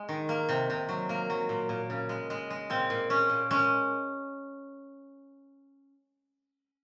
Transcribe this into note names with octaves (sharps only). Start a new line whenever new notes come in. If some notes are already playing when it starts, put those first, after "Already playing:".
Already playing: G#3
D#3
A#3
C3
C3
F#3
A#3
F#3
A#2
A#2
C#3
G#3
G#3
G#3
A#2 C4
A#2
A#2 C#4
A#2
G#3 C#4